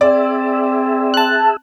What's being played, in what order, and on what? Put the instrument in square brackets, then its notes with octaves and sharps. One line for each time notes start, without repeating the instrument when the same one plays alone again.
[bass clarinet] C4 [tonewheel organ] G#4 E5 [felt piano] D5
[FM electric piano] A5 F#6